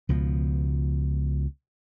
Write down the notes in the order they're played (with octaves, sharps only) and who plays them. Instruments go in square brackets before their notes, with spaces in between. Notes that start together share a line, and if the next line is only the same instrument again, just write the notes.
[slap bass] C#2 B2 F3